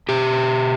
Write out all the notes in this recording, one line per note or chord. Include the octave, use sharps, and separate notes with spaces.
B2 G4